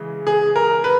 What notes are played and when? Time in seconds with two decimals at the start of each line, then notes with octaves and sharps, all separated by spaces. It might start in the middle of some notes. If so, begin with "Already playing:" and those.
Already playing: C#3 E3 G#3
0.27 G#4
0.56 A#4
0.84 B4